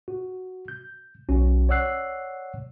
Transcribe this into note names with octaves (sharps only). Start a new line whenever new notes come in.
F#4
G6
B1 C#4 F#4
C#5 D5 F#5 E6 F#6 C7